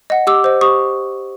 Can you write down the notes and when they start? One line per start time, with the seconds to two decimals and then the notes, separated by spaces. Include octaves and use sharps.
0.10 D#5 F#5
0.27 G4 D6 E6
0.44 C5 D#5
0.61 G4 C#6 D#6